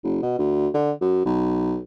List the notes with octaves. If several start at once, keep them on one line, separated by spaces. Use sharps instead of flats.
F#1
B2
D2
D3
F#2
B1